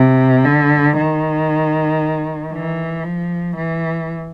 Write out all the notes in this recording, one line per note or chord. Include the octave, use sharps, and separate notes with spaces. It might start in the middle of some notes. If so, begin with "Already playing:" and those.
Already playing: C3
D3
D#3
E3
F3
E3